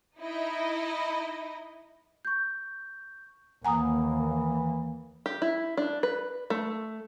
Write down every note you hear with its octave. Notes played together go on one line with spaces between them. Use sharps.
D#4 E4 D#5
C#6 G6
D#2 E3 A#3 F#5 G#5 A#5 D#6
G4
E4
D4
B4
A3